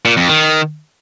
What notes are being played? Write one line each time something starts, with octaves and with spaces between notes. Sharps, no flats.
A#2
F2
D#3